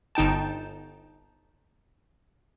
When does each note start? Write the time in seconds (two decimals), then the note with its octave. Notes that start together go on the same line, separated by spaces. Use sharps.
0.15 G1 D#4 G5 A5